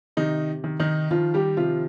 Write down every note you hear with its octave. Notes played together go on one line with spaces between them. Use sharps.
C3 D#3 D#4
D#3
D#3 D#4
D#3 F3 F4
G3 G4
C3 F3 F4